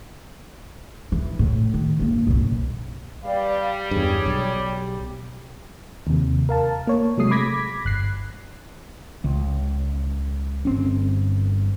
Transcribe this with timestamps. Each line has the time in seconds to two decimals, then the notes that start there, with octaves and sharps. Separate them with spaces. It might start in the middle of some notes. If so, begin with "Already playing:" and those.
1.12 E3
1.39 A2
1.74 D#3
1.99 G1 A#3
2.27 B1 F#2
3.24 G3 B4 D5 F5
3.91 E2 G2 G#4 C#5
4.26 B1
4.78 G4
6.07 D#2 C3
6.49 A#4 F5 A5
6.87 A#3 C#5
7.17 C3 F#3 G#3 A3 D#6 C7
7.31 B5 D6 G#6 A#6 B6
7.85 G1 F#6 C7
9.24 C#2
10.65 G1 C4 C#4